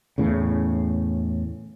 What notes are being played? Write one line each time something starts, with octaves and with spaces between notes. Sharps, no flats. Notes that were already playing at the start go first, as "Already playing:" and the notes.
E2 A2 C#3